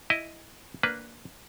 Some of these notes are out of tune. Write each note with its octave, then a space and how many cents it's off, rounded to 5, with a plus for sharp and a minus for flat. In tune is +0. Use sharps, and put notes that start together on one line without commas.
E4 +0 D#5 +0
A#3 +0 D4 +0 B4 +0